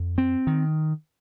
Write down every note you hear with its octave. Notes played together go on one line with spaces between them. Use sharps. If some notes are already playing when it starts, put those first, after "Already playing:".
Already playing: F2
C4
D#3